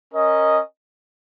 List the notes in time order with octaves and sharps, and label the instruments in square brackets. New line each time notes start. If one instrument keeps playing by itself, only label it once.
[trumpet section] C#4 A#4 D#5